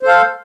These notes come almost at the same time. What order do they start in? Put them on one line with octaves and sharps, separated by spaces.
C5 A4 F5